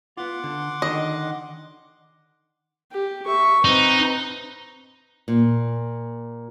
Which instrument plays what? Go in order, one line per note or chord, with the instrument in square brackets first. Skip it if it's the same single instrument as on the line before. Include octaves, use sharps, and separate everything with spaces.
[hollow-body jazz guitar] B3 F4 [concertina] F#5 C6 D6
[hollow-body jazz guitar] D3
[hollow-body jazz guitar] D3 D#3 D4 [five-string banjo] D#5
[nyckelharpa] G4
E5 C#6
[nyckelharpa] C4 B4 [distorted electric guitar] D#4
[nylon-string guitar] A#2